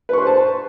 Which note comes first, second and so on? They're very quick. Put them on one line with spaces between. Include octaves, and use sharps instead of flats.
B4 C#6 C6 C5 A5